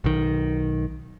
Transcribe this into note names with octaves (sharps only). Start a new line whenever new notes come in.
B1 D#3